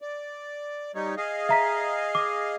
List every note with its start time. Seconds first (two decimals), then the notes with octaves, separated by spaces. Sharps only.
0.02 D5
0.95 G3 D#4 C#5
1.17 G#4 D#5 F5
1.49 E5 A#5 B6
2.15 D6